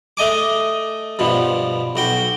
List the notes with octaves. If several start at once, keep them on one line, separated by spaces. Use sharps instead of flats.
A3 D#5 G#5 D6
G2 B2 F3
B1 F#4 G5